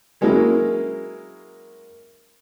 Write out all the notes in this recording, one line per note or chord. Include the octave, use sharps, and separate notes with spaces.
F#3 G#3 A#3 C#4 E4